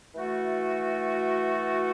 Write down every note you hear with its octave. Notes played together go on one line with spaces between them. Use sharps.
E3 A3 F#4 A4